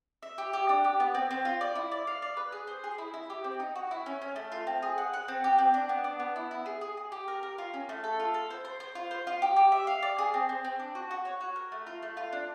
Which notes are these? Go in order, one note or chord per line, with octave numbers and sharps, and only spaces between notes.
E5
G4
G4
D4
G4
B3
C4
C4
F4
D5
E4
D5
F5
D5
B4
G#4
C5
G#4
E4
E4
G4
C4
D#4
F#4
E4
C#4
C#4
A3
F4
C4
G#4
F#5
F#5
C4
G4
C4
D4
B3
D4
B3
E4
E4
G#4
G#4
G#4
G4
A#4
A#4
F4
C#4
A3
A4
F4
A4
C5
C5
C5
F4
C5
F4
G4
G4
E5
F5
D5
G#4
C4
C4
C4
D4
F#4
F#4
C#5
F#4
A#4
A3
F4
A3
F4
D4